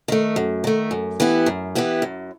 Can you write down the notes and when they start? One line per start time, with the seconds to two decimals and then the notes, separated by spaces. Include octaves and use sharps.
0.08 D#3 A3
0.36 F#2
0.64 D#3 A3
0.91 F#2
1.20 E3 B3 E4 G4
1.46 F#2
1.75 E3 B3 E4 G4
2.02 F#2